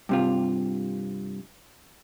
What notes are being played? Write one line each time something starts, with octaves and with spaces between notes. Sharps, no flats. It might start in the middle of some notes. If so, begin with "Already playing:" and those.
G2 C3 F4